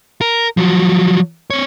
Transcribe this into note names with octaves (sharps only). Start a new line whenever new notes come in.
A#4
F3 F#3
C4 C#5